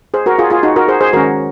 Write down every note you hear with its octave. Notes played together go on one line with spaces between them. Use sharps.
G#4 C5
F#4 A#4
F4 G#4
F4 G#4
D#4 F#4
F#4 A#4
G#4 C5
G#4 C5
D#3 G#3 C#4 F#4 A#4